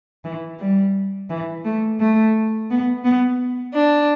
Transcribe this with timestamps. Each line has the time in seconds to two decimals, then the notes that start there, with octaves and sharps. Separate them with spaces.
0.24 E3
0.60 G3
1.30 E3
1.65 A3
2.00 A3
2.70 B3
3.04 B3
3.74 D4